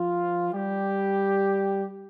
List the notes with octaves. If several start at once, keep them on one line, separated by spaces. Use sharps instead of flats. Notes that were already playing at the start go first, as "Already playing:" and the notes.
Already playing: F3 F4
G3 G4